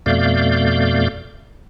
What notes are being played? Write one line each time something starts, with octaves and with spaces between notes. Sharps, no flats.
F2 B2 A3 D5 F5 G6